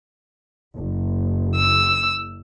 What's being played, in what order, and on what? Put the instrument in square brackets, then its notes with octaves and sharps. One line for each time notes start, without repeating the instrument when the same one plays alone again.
[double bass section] F#1
[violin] E6